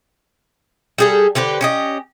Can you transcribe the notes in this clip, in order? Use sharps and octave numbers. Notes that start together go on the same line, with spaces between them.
G3 G#4 A4
D3 G4 B4 C5
C#4 G4 D#5